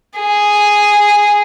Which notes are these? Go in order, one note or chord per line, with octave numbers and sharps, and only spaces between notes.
G#4